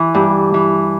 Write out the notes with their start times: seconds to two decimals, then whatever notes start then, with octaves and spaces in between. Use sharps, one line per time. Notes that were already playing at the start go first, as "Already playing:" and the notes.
Already playing: E3
0.14 G2
0.54 E3